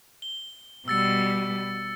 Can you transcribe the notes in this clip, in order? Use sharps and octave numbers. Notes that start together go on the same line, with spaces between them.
G7
B2 G3 E6 A6 C#7